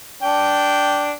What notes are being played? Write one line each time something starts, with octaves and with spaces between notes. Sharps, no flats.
D4 G5